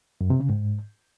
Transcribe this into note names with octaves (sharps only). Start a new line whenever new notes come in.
F#2
C3
C#3
G#2